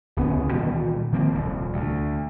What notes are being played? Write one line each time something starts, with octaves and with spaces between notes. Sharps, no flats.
D1 C#2 B3 C#4
A#2 D#3 E3 G3
D#3 F3 A#3 C4
D#1 C2
D2